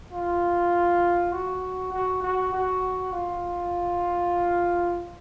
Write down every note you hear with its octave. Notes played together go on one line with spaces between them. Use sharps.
F4
F#4
F#4
F#4
F#4
F4